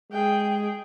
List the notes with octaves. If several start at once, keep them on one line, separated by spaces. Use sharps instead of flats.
G#3 G#4 G5